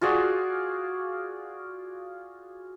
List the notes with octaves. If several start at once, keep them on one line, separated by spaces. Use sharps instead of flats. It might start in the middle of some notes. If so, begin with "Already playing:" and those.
F4 F#4 G#4 D5